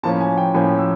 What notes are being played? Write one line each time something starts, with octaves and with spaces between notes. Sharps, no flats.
A2 F3 A#3 C#4 A5
G#5
G5
A2 F3 A#3 C#4 G#5
E6